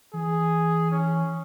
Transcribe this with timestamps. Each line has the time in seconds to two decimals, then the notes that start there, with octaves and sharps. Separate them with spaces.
0.13 E3 G#4
0.91 C#4